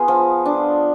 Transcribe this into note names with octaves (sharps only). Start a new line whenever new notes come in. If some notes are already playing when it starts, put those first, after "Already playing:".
Already playing: B3 F4 G#4
F3
D4